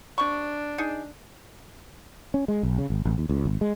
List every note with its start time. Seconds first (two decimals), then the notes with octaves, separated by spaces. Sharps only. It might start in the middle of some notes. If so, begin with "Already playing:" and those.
0.18 C3 D4 C#6
0.78 D#4 G#4
2.34 C#4
2.48 G#3
2.63 B1
2.78 C#3
2.90 G#1
3.05 A1
3.18 D#2
3.29 C#2
3.45 G#1
3.61 G#3